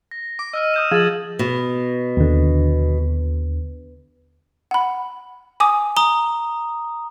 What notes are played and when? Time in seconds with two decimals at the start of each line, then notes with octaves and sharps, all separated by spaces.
0.11 A#6
0.39 D6
0.53 D#5 E6 F6 D#7
0.74 D#6 G6 E7
0.92 F3 G#4 G#6 A6 F#7
1.39 B2
2.17 D#2 D3
4.71 F#5 B5
5.60 G#5 D6 D#6
5.97 A#5 D#6 G7